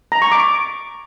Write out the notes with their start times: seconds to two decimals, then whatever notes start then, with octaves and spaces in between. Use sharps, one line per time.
0.12 A#5
0.22 C#6
0.32 D6